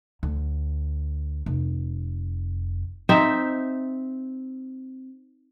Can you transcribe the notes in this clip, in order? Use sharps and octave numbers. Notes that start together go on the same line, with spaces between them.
D2
F1
C4 D#4 E5